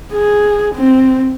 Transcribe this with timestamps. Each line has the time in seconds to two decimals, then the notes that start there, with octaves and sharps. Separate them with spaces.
0.13 G#4
0.75 C4